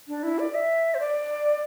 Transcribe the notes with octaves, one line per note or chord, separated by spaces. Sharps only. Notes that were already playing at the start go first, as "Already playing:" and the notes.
D4
E4
D5
E5
C5
D5